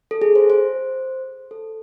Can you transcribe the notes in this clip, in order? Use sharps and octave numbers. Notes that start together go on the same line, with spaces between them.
A4
G#4
C5
C5
A4